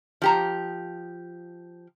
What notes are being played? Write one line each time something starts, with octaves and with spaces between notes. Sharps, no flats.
F3 G4 A#5